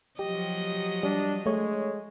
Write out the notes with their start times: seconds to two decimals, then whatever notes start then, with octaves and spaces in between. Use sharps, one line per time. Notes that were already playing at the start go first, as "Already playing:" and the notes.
0.19 F3 F#3 G4 D#5
1.03 G3 D4
1.46 G#3 A3 C#5